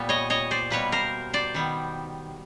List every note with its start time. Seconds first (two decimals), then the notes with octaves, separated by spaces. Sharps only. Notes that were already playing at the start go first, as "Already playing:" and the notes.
Already playing: A#2 G3 B3
0.09 C#5 D#5
0.30 C#5 D#5
0.51 C5 D5
0.70 B2 G3 A#3 B4 C#5
0.92 A#4 C5
1.33 C5 D5
1.54 D#3 G3 B3